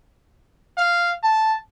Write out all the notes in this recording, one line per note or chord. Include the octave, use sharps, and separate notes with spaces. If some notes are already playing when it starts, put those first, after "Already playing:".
F5
A5